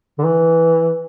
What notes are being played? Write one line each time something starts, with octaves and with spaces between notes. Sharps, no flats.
D3
E3